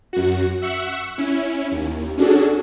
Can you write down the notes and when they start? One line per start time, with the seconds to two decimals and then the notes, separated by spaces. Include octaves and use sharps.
0.13 F#2 F#4
0.62 E5 F#5 C#6 E6 F#6
1.18 C#4 E4
1.72 D#2
2.18 C#4 D4 F#4 G#4 A4